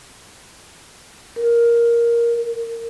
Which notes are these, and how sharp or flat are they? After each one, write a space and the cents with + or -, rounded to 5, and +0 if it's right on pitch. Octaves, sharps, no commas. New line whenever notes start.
A#4 +10
A#4 -20